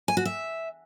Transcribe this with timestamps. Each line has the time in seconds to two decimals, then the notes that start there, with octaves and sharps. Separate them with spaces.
0.08 G#5
0.17 F#4
0.25 E5